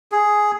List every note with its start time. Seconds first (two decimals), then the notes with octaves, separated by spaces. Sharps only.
0.12 G#4